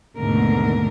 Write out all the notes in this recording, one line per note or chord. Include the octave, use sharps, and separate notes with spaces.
D#2 G#2 B2 D3 A3 A#4